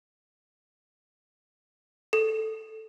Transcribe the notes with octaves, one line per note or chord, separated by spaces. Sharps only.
A4